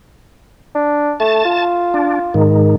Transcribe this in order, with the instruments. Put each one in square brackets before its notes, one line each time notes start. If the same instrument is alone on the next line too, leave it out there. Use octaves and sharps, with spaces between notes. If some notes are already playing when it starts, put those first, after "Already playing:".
[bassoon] D4
[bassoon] A3 [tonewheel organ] A5
[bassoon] F4
[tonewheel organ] D4
G#2 D#3